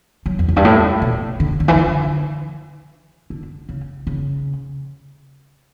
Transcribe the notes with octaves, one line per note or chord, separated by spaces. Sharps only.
F#3
E2
F#2
G2
A2
B2
D3
D3
E3
D3
D3
C#3
C#3